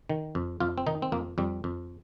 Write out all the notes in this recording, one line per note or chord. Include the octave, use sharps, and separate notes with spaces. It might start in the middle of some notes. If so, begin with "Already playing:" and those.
D#3
F2
F2 F4
C4
D#3 D#4
C4
F2 A#3
F2 G3
F2